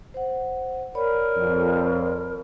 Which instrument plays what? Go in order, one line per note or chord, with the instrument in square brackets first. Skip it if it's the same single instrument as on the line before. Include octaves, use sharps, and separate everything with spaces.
[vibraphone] C5 F#5
[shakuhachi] A#4 [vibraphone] C#5 D5 B5
[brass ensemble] F2